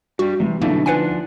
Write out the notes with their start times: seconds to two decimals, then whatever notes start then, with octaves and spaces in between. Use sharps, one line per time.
0.19 G2 G3 F#4
0.40 C3 E3 G3
0.62 F#2 B2 D3 A3 A#3 D#4 E4
0.86 F3 D4 B4 F#5 G#5